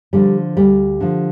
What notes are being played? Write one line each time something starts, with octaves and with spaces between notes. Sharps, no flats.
D3 F3 G3
D2 G3
D3 F3